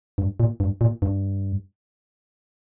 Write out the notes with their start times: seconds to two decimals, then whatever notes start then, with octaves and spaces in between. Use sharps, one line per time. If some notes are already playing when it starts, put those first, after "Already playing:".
0.18 G2
0.40 A#2
0.60 G2
0.81 A#2
1.02 G2